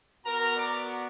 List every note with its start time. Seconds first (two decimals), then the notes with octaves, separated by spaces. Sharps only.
0.24 B3 F#4 A#4 A#5
0.57 D5 D6